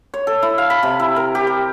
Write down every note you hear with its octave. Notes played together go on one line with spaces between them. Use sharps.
C#5
A4
E4
F5
B5
C3
E4
A#4
G4
A#5